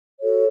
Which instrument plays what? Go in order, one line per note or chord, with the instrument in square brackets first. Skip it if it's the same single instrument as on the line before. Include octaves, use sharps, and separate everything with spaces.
[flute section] F#4 A4 C#5